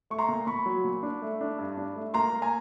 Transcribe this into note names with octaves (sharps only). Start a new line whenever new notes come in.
A3 C#6
A#5 C6
A#2
A#2 B5 C#6
F#3
A#2
D4
A3
D4
G2
D4
A3
A#3 A#5 C6
A#3
G#5 A#5